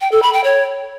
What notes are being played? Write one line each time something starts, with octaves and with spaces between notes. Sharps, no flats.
G5
A4
B5
G5
C#5